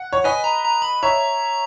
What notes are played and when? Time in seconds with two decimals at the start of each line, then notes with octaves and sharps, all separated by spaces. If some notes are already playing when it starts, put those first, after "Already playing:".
Already playing: F#5
0.13 C#5
0.24 B4 D#5 G#5
0.44 A#5
0.64 A#5
0.82 B5
1.03 C#5 E5 A#5